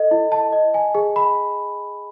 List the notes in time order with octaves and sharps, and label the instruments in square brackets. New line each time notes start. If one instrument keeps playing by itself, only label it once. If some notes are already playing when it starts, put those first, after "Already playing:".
Already playing: [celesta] A4 D#5
E4
A5
D#5
G#5
G#4
B5